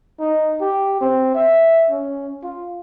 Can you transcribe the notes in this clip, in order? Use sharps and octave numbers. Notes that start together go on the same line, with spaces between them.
D#4
G4
C4
E5
C#4
F4